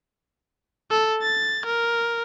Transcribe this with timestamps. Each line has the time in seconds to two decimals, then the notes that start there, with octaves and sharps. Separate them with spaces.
0.91 A4
1.22 A6
1.66 A#4